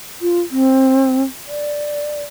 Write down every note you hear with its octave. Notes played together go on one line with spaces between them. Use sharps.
F4
C4
D5